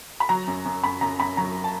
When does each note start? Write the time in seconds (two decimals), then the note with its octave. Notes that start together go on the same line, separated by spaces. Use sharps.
0.20 B5
0.29 F#3 A#5
0.47 F#2
0.65 F#2
0.84 F#2 B5
1.01 F#2 A#5
1.20 F#2 B5
1.37 F#3 A#5
1.64 A5